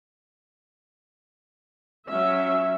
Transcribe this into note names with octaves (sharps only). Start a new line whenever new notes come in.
F#3 C#4 E5